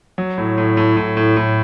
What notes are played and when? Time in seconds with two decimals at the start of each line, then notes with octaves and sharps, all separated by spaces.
0.18 F#3
0.38 A2
0.58 A2
0.77 A2
0.97 A2
1.17 A2
1.37 A2